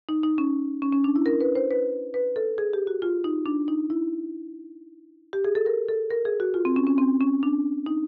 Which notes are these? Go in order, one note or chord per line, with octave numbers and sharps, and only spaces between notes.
D#4
D#4
C#4
C#4
C#4
D4
E4
A#4
B4
C5
B4
B4
A4
G#4
G4
F#4
F4
D#4
D4
D#4
E4
G4
G#4
A4
A#4
A4
A#4
G#4
F#4
F4
C4
C#4
C#4
C4
C#4
D4
D#4